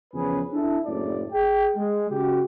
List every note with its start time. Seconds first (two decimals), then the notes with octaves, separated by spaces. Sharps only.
0.13 E2 C#3 F3 C#4 G#4 B4
0.52 D4 E4 A4
0.86 F#1 A2 D5
1.33 G#4 G5
1.75 G#3
2.11 C#3 F#4 G4